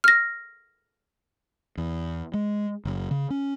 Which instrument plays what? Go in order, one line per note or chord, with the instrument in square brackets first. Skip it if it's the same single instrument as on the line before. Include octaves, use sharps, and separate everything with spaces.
[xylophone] F6 A#6
[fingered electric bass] E2
G#3
F#1
C#3
C#4